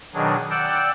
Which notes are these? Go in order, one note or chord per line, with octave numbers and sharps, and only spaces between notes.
B2 D#3 F#3 D4 G#4
D5 F#5 G5 E6